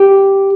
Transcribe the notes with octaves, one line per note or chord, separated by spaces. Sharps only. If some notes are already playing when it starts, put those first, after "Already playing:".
Already playing: G4